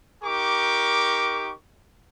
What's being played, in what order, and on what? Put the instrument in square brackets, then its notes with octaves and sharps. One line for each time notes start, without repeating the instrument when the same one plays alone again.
[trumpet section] D#4 G4 A#4 C#6 D6